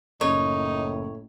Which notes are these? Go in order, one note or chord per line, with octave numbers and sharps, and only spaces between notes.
F#1 A2 D#4 C#5